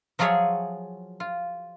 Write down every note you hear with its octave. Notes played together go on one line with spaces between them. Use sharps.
F3 F#3 F4 G#4 C#5 E5
F4